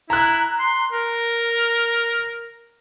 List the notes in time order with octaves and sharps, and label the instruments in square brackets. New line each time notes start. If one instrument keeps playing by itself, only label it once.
[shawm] E4 [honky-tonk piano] A#5 F#6
[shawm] C6
A#4